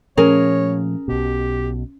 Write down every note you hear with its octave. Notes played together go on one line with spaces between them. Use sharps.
A#2 F3 A3 C#4 G#4 A#4 C#5
B1 B2 G4